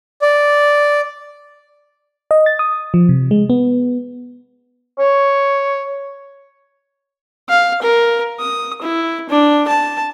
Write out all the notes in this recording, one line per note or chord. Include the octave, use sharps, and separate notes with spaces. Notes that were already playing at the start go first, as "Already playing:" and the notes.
D5
D#5
A6
D#6
F3
C3
G#3
B3
C#5
F5
A#4
D#6
E4
D4
A5